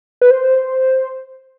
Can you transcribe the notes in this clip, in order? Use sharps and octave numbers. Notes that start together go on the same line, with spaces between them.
B4
C5